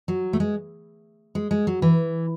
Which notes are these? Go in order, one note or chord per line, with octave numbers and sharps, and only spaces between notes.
F#3
A3
G#3
G#3
G#3
F#3
E3